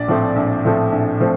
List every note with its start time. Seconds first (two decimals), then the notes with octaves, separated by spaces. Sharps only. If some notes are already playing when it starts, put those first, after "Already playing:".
Already playing: A#1 D5
0.08 A2 F3 A3 C4
0.36 A#1
0.65 A2 F3 A3 C4
0.92 A#1
1.20 A2 F3 A3 C4